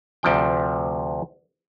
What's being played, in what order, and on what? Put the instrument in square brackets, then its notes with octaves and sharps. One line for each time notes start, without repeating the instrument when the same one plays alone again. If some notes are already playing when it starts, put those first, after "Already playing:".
[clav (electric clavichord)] D2 C3 F3 G5